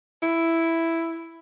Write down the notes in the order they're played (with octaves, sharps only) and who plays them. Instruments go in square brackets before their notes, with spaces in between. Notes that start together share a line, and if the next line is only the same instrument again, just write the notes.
[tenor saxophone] E4